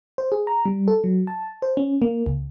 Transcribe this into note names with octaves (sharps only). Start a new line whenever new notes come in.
C5
G#4
A#5
G3
A4
F#3
A5
C5
C#4
A#3
C#2